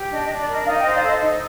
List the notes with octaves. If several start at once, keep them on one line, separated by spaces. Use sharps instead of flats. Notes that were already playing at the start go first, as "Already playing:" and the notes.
Already playing: G4
D4 D#5
D#5
D4
D5
A#4 D#5
D#4 D5 F5
D#5 G5
C5
D5 F5
A4 D#5
D#4 D#5